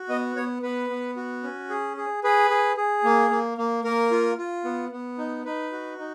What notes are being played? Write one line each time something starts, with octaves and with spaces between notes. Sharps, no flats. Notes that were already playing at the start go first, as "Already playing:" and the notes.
Already playing: F#4
B3 D#5
B3 C#5
B3 B4
B3
F#4
C#4
G#4
G#4
G#4 B4
G#4
G#4
A#3
A#3
A#3
A#3 A#4
F4
F4
B3
B3
D#4
D#4 B4
F#4
D#4